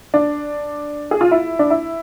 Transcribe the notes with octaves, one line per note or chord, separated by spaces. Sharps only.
D4
G#4
F4
E4
D4
E4